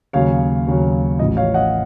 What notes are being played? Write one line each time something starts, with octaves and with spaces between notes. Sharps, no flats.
D#2 C#3 F#3 C#5 F5
D#2 C#3 F#3
A1 A2 F3 D#5
C#5 F5
D#5 F#5